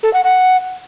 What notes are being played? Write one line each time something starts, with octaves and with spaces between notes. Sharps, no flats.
A4
F#5
F#5